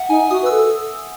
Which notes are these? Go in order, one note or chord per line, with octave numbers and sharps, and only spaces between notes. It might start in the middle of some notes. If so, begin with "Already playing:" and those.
Already playing: E5 F#5
D#4 G#5
F#4 D#6
B4 E6
A4